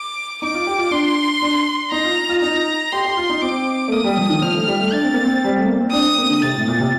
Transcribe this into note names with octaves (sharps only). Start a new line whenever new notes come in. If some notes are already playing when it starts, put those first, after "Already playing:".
Already playing: D6
D#4 D6
F4
G4
F4
D4 C6
D4
D#4 A#5
F4
F4
D#4 A#5
G4 C6
G4
F4
D#4
C4 D6
A3
A#3 D#6
G3
F3
D#3
F3 F6
A3
G3
A3
D4 A6
C4
A#3
C4
G3
A3
A#3
C4
D4 D#6
C4
A#3
D3
C3 A6
A2
A#2
C3